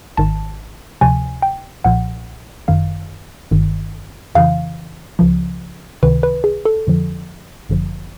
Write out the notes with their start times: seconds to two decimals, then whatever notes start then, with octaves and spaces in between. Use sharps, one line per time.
0.17 G#1 G#2 D#3 A5
1.01 D2 C3 F3 G#5
1.42 G5
1.84 B1 A#2 F3 F#5
2.68 G1 F#2 D#3 F5
3.51 G1 G2 D#3
4.35 F2 C#3 E3 F5
5.19 C#2 C#3 F3
6.02 C#2 C3 D#3 B4
6.23 B4
6.44 G#4
6.65 A4
6.87 F2 D3 F3
7.69 G1 F#2 D3 F3